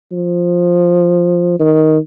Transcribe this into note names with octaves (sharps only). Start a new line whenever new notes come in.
F3
D#3